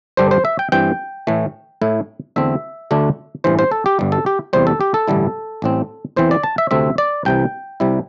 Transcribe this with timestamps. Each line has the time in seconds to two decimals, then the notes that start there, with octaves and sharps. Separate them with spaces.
0.17 G2 D3 G3 D4 C5
0.31 C5
0.45 E5
0.59 G5
0.72 G2 E3 C4 G5
1.27 A2 E3 A3
1.81 A2 A3 E4
2.36 E2 D3 A3 C4 E5
2.91 D2 D3 A3 D4
3.44 A1 G2 E3 C5
3.59 C5
3.72 A4
3.86 G4
3.99 G1 G2 G3
4.12 A4
4.26 G4
4.53 E2 C3 G3 C5
4.67 A4
4.81 G4
4.94 A4
5.08 A1 G2 D3 G3 E4
5.62 A1 A2 G3 C4
6.16 E2 E3 C4 C5
6.31 D5
6.43 A5
6.58 E5
6.71 D2 C3 A3 C4 E5
6.98 D5
7.25 C2 C3 E3 G5
7.80 C2 C3 G3 E4